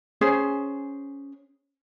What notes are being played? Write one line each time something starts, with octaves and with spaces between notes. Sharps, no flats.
C#4 G#4 C5